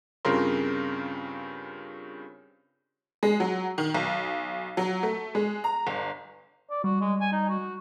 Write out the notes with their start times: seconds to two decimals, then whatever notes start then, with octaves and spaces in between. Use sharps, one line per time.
0.25 G2 C#3 C4 F4 A#4 C6
3.23 G#3
3.40 F#3
3.78 D#3
3.94 B1
4.77 F#3
5.03 A3
5.35 G#3
5.64 A#5
5.87 G1
6.70 D5
6.84 G3 F#4
7.01 G#3
7.21 G#5
7.32 D#4
7.49 F#4